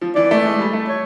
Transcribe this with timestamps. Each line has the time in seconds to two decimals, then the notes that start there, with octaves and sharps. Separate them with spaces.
0.01 F3
0.15 E3 D5
0.31 A3
0.45 G#3
0.59 G3
0.73 A3
0.88 C#5